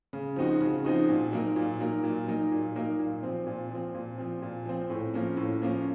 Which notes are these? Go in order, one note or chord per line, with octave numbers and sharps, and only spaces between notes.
C#3
F3 C4 D#4 F#4
C#3
F3 C4 D#4 F#4
A#2
F#3 A#3 D#4 A#4
A#2
F#3 A#3 D#4 A#4
A#2
F#3 A#3 D#4 A#4
A#2
F#3 A#3 D#4 A#4
A#2
F3 C4
A#2
F3 C4
A#2
F3 C4
A#2
F3 C4
A2
F3 A#3 C#4
A2
F3 A#3 C#4